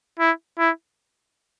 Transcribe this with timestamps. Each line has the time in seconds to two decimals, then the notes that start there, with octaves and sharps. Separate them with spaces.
0.19 E4
0.58 E4